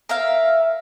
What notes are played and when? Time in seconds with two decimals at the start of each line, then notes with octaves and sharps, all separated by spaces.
0.09 A#4 E5 F5